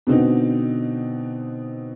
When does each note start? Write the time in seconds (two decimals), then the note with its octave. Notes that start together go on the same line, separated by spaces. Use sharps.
0.07 B2 D3 C4 D#4